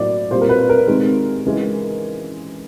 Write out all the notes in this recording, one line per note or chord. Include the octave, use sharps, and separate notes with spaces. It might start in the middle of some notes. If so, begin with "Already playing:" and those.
Already playing: A2 F#3 A#3 D5
A#2 G3 C4 C5
A#4
B4
A#4
C3 D#3 G#3 C4
C#3 E3 G#3